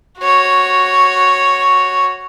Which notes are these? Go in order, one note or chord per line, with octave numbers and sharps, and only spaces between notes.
F#4 C#5